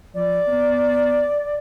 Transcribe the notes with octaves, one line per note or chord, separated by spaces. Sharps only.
F3 D5
B3